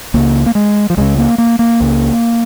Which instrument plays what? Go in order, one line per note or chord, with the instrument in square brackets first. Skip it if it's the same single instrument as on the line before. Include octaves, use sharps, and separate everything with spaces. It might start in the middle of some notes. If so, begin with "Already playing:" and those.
[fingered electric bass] C#2 C#3 A#3
A#3
G#3
F3
C#2 C#3 G#3
A#3
A#3
A#3
C#2 C#3